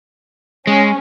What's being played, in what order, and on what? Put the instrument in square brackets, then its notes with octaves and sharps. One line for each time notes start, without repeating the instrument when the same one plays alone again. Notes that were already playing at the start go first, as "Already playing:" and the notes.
[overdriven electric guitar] G#3 [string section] C#4